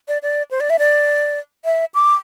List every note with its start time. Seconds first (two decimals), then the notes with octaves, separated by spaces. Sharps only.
0.08 D5
0.23 D5
0.51 C5
0.60 D5
0.70 E5
0.79 D5
1.65 E5
1.94 D6